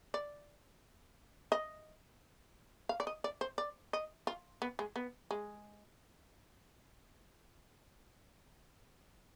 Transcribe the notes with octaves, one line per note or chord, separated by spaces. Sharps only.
D5
D#5
F5
D5
D#5
D5
C5
D5
D#5
F4
B3
G#3
B3
G#3